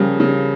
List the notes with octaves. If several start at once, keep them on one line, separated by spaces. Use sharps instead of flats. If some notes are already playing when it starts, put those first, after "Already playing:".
Already playing: C#3 F3 G3 A#3 G4
C#3